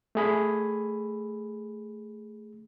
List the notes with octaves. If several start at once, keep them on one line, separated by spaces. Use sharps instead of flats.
A3 G#4 B5